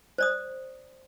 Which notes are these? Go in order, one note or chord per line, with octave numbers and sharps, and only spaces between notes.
C5 D5 D#6